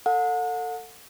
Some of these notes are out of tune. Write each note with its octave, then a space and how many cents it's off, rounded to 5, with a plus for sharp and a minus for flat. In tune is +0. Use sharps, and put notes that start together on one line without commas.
A4 +30 F#5 -35